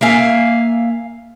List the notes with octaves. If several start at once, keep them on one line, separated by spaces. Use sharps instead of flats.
A#3 E5 F5 G#5